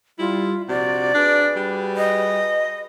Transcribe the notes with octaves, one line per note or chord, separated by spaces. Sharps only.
G3 E4 F4
A#1 C3 F#4 D5
D4 F#4 G#4 B4
G3
D#5